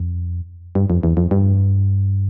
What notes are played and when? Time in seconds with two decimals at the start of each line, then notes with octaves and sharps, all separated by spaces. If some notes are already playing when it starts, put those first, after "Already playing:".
Already playing: F2
0.75 G2
0.90 F2
1.03 E2
1.17 F2
1.31 G2